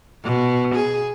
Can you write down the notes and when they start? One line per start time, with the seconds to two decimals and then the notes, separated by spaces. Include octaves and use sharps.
0.24 B2
0.75 G#4